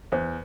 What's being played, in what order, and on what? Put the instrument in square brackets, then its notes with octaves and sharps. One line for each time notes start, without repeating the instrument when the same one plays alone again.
[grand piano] E2 [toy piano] C5